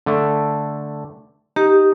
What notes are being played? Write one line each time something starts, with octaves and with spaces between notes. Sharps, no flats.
D3 A3
D#4 G4